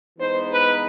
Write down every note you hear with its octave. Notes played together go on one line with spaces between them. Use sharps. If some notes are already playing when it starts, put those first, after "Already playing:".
E3 G#3 B3 D#4 C5
B4